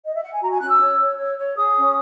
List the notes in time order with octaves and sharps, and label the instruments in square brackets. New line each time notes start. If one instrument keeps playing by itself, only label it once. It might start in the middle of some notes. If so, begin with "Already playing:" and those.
[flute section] D#5
E5
F#5
G#5
F#4 A#5
G#5
C#4 F#6
E6
C#5
C#5
C#5
C#5
G#4 D#6
C#4